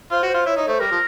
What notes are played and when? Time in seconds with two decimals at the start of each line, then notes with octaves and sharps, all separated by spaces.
0.12 F4 C5
0.23 F#4
0.29 F4 C5
0.46 E4 C#5
0.57 D#4 C#5
0.68 A3 C5
0.80 G3 A#4
0.91 F3